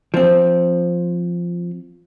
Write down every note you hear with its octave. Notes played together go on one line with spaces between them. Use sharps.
F3 C4